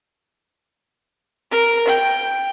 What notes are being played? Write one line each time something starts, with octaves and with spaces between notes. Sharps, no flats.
A#4
G5